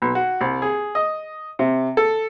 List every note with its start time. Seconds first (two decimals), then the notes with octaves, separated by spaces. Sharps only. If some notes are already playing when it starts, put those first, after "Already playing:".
0.02 B1
0.15 F#4
0.41 C2
0.62 G#4
0.95 D#5
1.59 C3
1.97 A4